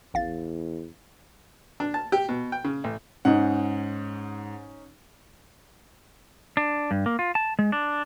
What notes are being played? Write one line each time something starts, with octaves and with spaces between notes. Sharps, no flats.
A1 E2 F5 A6
D4
A5
G4
B2
G5
C#3
A1
G#2 C#4 D#4 F#5
D4
G2
A#3
F4
A5
G#3
D4